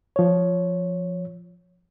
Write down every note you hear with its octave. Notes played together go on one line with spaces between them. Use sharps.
F3 C#5